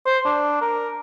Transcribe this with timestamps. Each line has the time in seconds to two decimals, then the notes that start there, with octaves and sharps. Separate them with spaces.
0.06 C5
0.25 D4
0.61 A#4